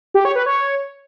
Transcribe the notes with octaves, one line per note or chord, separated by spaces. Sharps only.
G4
C#5
B4
C#5